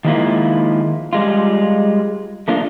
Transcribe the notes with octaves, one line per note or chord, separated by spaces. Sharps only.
D#3 F3 G#3 A#3 E4 F4
G3 G#3 F4
A3 A#3 D4 F4